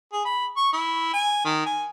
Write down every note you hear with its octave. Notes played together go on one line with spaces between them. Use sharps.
G#4
B5
C#6
E4
G#5
D#3
G#5